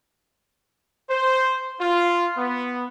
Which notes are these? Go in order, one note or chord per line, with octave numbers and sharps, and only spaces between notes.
C5
F4
B3